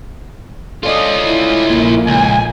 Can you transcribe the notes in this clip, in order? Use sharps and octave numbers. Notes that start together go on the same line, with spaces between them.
C#4 F4 A4 D5 D#5
E4
A#1 A#2 A#3
C#2 G#5